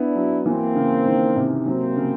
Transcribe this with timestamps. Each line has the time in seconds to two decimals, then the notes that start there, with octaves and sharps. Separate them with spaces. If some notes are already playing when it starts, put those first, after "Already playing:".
Already playing: B3 D4 E4
0.15 F#3
0.46 E3 A#3 C4
0.76 C#3
1.06 D#3
1.36 C3
1.66 F#3 A#3 C4
1.96 C#3